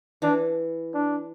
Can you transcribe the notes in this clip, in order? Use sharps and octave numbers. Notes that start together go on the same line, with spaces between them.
E3 D4
D4